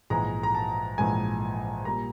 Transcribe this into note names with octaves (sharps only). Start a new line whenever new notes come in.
A#1 G#2 E3 G#3 A#5
A#5
A5
A#1 G#2 E3 G#3 G#5
A#2 G3 A#3 A#5